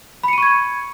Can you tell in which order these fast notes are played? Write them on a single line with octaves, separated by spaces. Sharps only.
B5 C#7 D#7 C#6 G#6